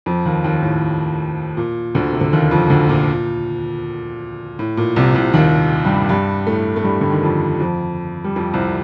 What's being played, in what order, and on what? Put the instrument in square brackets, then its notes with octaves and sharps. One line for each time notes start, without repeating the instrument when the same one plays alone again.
[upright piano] F2 F3
D#2 D#3
D#2 D#3
A2
A#2
D2 D3
C3
D3
D#2 D#3
F2 F3
D2 D3
A#2
A2
A#2
C2 C3
C2 C3
D#2 D#3
G2 G3
G2 G3
A2 A3
A3
G2 G3
D3
D#3
F2 F3
F2 F3
G3
F2 F3
C2 C3